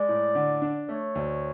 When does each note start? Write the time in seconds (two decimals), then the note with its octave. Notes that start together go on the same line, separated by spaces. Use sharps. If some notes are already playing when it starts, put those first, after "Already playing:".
Already playing: G#3 D5
0.09 A2
0.35 D3
0.62 D4
0.89 A3 C#5
1.15 D2